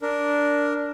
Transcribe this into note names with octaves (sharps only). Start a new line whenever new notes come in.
D4 A#4